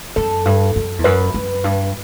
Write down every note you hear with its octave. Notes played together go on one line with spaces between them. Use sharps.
F#2 A4
G2
F#2
E2
F#2 B4
F#2
G2